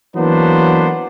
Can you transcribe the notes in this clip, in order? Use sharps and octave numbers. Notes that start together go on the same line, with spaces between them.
E3 F#3 A#3 B3 D4 C5